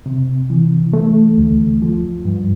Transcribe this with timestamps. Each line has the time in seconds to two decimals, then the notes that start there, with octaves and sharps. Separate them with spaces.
0.06 C3
0.50 E3
0.93 A3
1.38 D2
1.82 F3
2.25 G2